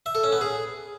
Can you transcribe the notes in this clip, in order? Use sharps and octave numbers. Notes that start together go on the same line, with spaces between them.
E5
A4
C#4
B3
G#4